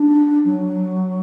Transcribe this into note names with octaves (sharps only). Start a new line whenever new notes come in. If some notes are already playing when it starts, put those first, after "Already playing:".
Already playing: D4
F#3